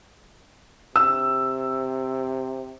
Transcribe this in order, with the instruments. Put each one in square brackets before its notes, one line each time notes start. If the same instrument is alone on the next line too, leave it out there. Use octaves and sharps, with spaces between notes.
[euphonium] C3 [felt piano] E6